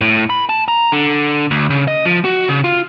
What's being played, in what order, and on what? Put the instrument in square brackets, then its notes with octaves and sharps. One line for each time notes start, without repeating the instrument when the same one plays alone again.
[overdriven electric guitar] A2
B5
A5
A#5
D3
D2
C#3
D#5
F3
F#4
C#3
F4